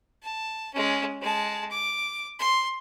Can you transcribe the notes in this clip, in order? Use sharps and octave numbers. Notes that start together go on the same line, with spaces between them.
A5
G#3 C#4
G#3 A5
D6
C6